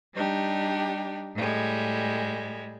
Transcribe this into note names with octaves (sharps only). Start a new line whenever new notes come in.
G3 D4 D#4 G4
A2 G3 G#3